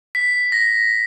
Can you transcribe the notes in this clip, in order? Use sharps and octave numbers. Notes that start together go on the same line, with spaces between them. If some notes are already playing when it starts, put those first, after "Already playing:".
B6
A#6